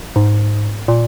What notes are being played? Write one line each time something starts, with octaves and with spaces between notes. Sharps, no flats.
G#2
A#2